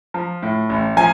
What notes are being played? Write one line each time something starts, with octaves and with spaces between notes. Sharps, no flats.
F3
A2
A1
F3 G#5